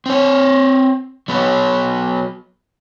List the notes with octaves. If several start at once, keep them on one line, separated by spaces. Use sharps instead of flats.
C4 C#5
F#3 B3 F#4 C#5